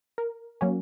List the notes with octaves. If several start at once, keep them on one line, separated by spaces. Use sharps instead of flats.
A#4
F#3 A#3 C#4